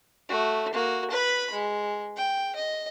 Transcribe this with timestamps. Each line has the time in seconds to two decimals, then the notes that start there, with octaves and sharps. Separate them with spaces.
0.29 A3 F#4
0.73 A#3 F#4
1.11 B4 B5
1.53 G#3
2.17 G5
2.55 D#5